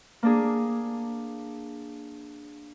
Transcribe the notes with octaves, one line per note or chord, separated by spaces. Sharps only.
A#3 D4 G#4